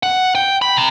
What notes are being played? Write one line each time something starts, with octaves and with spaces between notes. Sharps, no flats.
F#5
G5
B5
C3